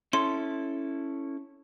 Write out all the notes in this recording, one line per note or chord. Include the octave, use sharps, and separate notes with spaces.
C#4 E4 A4 C6